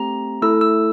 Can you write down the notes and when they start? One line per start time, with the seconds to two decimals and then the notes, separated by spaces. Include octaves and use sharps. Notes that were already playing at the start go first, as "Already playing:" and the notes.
Already playing: A3 C4 G4 A#5
0.42 A3 E4 A4 E6
0.61 E6